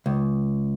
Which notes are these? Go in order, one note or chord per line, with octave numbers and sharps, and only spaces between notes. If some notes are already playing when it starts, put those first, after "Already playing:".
C#2